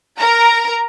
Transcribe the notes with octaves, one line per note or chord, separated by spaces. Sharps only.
A#4 A#5